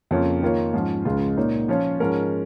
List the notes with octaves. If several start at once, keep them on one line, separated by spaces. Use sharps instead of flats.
F2 C#3 A#3 F4 C#5
D#3 A#3 F4 A#4 C#5
G#2 F3 C#4
C#2 C#3 G#3 F4
A#2 A#3 D#4 C#5
F3 C#4 F4 C#5
G#2 F3 G#3 C#4 A#4